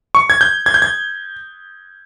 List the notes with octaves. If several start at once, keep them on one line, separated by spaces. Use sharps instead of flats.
C#6
G#6
G6
G#6
G6
G#6